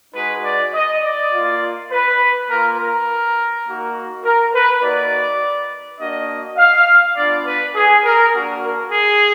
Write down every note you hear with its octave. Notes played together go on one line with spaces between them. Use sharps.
G#3 D#4 F#4 B4
D5
D#5
D5
A#3 F4
B4
A#3 F4 A#4
A#4
A#3 D#4 F#4
A#4
B4
A#3 D#4 F#4 D5
A#3 D4 F#4 D#5
F5
B3 D4 F4 D5
B4
G#4
A#4
A#3 D4 F#4
A#4
G#4